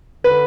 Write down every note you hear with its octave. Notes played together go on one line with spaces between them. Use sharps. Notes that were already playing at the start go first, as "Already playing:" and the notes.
D3 B4